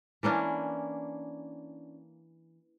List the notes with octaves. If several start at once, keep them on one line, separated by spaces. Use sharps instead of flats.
E3 A#3 C#4 D4